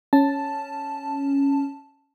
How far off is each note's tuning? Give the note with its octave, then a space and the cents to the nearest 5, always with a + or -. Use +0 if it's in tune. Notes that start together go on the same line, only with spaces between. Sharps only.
C#4 +0 A5 +0